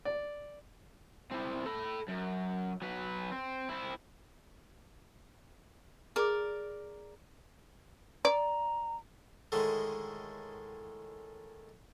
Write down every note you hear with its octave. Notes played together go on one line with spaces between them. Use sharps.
D5
C4 E4
A4 B5
F#2
F#3 B4
C4
C4 E4
G#4 A#4 D5 D6
D5 A#5
A2 D3 D#3 G#3